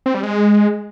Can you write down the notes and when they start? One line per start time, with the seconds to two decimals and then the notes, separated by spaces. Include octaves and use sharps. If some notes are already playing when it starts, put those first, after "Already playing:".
0.06 C4
0.14 G3
0.23 G#3